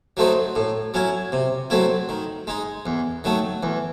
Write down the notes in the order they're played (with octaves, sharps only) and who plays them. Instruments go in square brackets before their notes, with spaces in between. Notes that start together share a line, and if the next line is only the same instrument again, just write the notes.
[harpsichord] F#3 A3 C4 D#4
A2
F#3 C#4 E4
C3
F#3 A3 C4 E4
D#3
G#3 D#4
E2
D#3 F#3 A3
E2